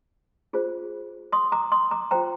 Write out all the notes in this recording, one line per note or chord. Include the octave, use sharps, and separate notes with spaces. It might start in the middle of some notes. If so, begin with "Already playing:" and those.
F4 G#4 C5
C6 D#6
A#5 D6
C6 D#6
A#5 D6
F4 C5 G5 A#5